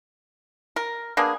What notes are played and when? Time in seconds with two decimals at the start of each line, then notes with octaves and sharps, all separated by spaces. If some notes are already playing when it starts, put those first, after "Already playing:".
0.76 A#4
1.17 A#3 B3 D4 G#4